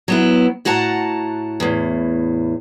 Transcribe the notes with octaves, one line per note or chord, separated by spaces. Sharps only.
F#3 B3 E4
A2 F#4 F#5 A5 A#5
E2 A2